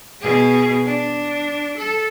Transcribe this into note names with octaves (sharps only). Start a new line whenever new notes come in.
B2 G#4
D4
A4